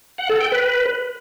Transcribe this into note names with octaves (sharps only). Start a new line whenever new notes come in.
F#5
A4
G5
B4